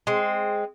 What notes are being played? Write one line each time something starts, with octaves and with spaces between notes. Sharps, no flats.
G#3 C4